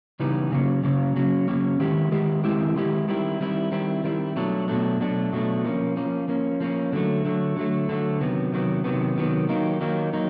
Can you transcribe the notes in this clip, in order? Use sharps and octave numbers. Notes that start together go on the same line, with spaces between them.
C#3 E3 G3 B3 D#4
C#3 F#3 A#3 C#4
C#3 F#3 A#3 C#4
C#3 F#3 A#3 C#4
C#3 F#3 A#3 C#4
D#3 G#3 C4 E4 G4
D#3 G#3 C4 E4 G4
D#3 G#3 C4 E4 G4
D#3 G#3 C4 E4 G4
D#3 G3 C4 E4
D#3 G3 C4 E4
D#3 G3 C4 E4
D#3 G3 C4 E4
B2 F#3 A3 D4
B2 F#3 A3 D4
B2 F#3 A3 D4
B2 F#3 A3 D4
F3 A#3 C#4
F3 A#3 C#4
F3 A#3 C#4
F3 A#3 C#4
D3 F#3 A3
D3 F#3 A3
D3 F#3 A3
D3 F#3 A3
C3 D#3 F#3 B3
C3 D#3 F#3 B3
C3 D#3 F#3 B3
C3 D#3 F#3 B3
D#3 F#3 A#3 D#4
D#3 F#3 A#3 D#4
D#3 F#3 A#3 D#4